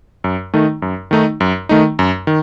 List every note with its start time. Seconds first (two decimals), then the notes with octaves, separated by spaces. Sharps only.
0.24 F#2
0.54 D#3 A3 D#4
0.82 F#2
1.11 D#3 A3 D#4
1.40 F#2
1.69 D#3 A3 D#4
1.99 F#2
2.27 D#3